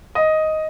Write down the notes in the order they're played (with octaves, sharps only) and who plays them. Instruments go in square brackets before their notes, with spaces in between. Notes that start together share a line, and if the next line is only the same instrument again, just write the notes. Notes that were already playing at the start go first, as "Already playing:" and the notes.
[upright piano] D#5